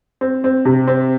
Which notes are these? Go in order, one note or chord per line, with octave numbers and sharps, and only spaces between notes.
C4
C4
C3
C4